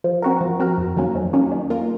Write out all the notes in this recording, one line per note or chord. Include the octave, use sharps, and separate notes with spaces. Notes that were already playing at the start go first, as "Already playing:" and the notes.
F3
C4 F#4 A#4
F3
C4 F#4 A#4
F2
D#3 F#3 A#3 C#4
F2
D#3 F#3 A#3 C#4
D#3
A#3 F4 A#4